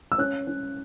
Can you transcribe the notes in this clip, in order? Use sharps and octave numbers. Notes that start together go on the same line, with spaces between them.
E6
C#4 F#6
C#4